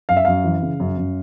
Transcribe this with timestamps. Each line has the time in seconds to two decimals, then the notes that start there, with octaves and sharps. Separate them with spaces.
0.09 F#2 F5
0.17 E5
0.25 F#2 F5
0.44 E3
0.62 C#3
0.80 F#2
0.97 F#2